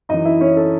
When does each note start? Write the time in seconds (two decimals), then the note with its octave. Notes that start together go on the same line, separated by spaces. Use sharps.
0.09 F#2 E3 D#4 D#5
0.25 E4 E5
0.41 C#4 C#5
0.57 A4